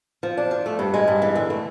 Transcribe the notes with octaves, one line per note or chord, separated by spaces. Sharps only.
F3
D4
F3
A3
G2
G#3
G2
E3
D3
A3